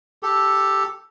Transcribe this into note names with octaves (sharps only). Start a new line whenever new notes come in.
G4 A4